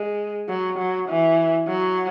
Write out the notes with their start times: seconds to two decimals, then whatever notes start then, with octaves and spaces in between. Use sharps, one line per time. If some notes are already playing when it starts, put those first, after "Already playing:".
Already playing: G#3
0.49 F#3
0.78 F#3
1.09 E3
1.67 F#3